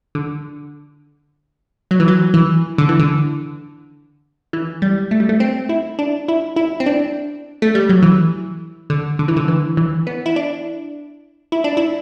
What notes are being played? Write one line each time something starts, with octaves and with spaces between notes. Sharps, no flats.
D3
F#3
E3
F#3
E3
D3
E3
D3
E3
G3
A3
G3
A3
C4
E4
D4
E4
E4
C4
D4
A3
G3
F#3
E3
D3
D3
E3
D3
E3
E3
B3
E4
D4
E4
D4
E4